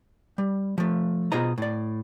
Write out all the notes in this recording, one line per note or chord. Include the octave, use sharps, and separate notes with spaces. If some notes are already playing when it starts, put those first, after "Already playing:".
G3
F3 A3
B2 F4 G#4 C5 D#5 A#5
A2 D5